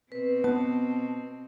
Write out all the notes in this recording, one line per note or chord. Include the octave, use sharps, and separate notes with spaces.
B2 C4 B4
B3 A5